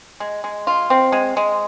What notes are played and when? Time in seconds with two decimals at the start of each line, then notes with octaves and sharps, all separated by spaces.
0.20 G#3
0.44 G#3
0.67 F4
0.90 C4
1.12 G#3
1.37 G#3